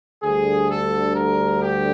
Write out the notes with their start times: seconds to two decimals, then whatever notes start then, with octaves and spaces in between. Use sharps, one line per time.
0.22 D2 D3 G3 G#4
0.69 A4
1.15 A#4
1.61 G4